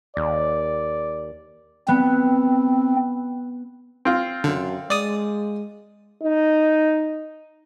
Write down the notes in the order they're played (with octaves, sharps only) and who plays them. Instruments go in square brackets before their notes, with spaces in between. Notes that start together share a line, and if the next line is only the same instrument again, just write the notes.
[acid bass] D#2 [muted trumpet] D5
[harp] B3 [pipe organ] C4
[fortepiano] C4 F4
[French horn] F#2 [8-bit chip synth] D3
[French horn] G#3 [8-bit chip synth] D5 D#6
[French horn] D#4